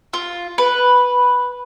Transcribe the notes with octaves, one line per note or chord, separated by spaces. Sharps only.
F4
B4